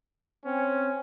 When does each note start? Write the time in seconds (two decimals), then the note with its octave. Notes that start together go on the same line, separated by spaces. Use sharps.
0.45 C4 C#4